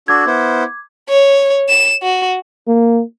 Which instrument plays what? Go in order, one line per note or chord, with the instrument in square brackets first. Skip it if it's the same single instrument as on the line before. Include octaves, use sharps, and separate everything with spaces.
[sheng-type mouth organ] D4 F#4 A4 [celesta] D6 G#6
[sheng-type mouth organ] B3 E4 C5
[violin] C#5
E7
F#4
[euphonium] A#3